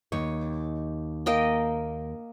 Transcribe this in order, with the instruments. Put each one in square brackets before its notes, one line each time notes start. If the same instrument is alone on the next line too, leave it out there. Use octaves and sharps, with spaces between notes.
[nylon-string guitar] D#2 D#4 C#5
[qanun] A#3 D#5 G5